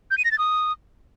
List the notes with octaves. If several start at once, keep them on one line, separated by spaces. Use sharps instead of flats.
G6
D#7
A#6
A6
D#6